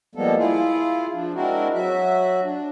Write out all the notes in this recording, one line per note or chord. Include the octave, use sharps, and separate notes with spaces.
F3 G3 G#3 A#3 B3 A4
E4 F4 G#4
F3 D4
G#3 C4 D4 E4 F#4 A#4
F#3 F#4 E5
D4